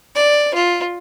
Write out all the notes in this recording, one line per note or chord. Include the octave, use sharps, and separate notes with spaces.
D5
F4